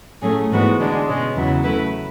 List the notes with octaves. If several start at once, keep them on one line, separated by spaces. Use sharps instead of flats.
A2 F#3 A3 C#4 G#4
G#2 E3 G#3 B3 F#4
D3 G#3 D4
B2 G#3 C#4
E2 C#3 F#3 B3 E4
C#3 F#3 A3 E4 B4